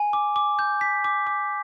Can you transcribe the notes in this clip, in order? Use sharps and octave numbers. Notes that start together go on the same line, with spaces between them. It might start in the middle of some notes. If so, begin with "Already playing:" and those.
Already playing: G#5
D6
D6
G6
B6
D6
D6